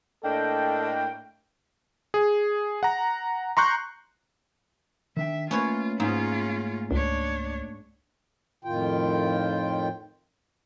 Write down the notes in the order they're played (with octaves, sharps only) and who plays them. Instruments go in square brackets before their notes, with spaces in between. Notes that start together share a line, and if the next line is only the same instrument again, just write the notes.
[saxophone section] A2 A#3 D4 [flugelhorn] A4 [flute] D#5 [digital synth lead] G5
[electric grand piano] G#4
F#5 A#5
A#5 C6 C#6 F#6 G6
[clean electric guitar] D#3 D4 G5 [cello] E5
[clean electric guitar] A3 A#3 [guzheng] C#4 B4 C#5 [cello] F4
[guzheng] G#2 [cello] C#4 F4
[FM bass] C#2 [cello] D4 C#5
[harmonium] F2 A2 D#3 F4 G5